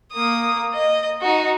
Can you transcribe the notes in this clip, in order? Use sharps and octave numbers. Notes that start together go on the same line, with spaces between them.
A#3 D#6
D#5
D#4 F#4